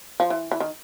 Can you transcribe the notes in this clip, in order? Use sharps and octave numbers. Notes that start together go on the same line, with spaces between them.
F3
E3
E3
D#3